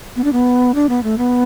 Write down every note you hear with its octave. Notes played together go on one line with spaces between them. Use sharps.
B3
D4
B3
D4
B3
A3
B3